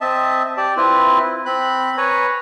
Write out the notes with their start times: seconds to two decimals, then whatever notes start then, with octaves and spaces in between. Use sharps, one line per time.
0.01 C4 D#5 E5 A5
0.57 G4 D5 A5
0.77 C4 E4 F4 B4
1.46 C4 B5 F#6
1.98 B4 C#5 G#5 A#5